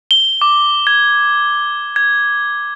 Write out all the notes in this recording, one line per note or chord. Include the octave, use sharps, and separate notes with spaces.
G7
D6
G#6
G#6